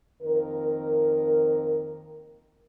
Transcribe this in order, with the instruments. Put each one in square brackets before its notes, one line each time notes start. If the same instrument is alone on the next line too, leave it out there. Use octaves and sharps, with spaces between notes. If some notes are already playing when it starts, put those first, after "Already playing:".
[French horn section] F2 D#3 A#3 A#4